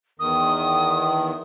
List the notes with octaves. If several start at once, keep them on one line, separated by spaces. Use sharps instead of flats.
E2 D#3 D#6